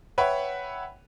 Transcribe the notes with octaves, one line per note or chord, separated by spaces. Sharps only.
B4 C#5 E5 F#5 G5